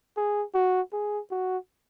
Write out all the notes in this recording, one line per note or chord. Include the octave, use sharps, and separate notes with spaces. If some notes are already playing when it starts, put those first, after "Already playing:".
G#4
F#4
G#4
F#4